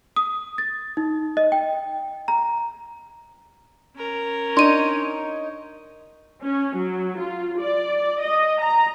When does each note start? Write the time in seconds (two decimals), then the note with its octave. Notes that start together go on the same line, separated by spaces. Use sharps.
0.16 D#6
0.58 A6
0.97 D#4
1.37 D#5
1.52 G5
2.28 A#5
3.96 C#4 A#4
4.57 D4 D#4 C#5 C6 D#7
6.42 C#4
6.76 F#3
7.20 F4
7.61 D5
8.21 D#5
8.61 A#5